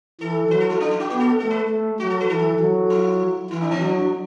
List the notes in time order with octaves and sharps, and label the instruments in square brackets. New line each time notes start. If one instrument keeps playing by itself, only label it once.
[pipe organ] E3 [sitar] A4
[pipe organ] F#3 [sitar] B4
[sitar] A4
E4
D4
E4
F#4
[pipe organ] B3 [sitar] F#4
[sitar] A4
[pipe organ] A3 [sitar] A4
[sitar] B4
[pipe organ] A3
[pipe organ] F#3 [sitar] F#4
[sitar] A4
B4
[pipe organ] E3 [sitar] A4
[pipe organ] F#3
[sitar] E4
[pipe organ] E3 [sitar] E4
[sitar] D4
B3
[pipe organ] F#3 [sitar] D4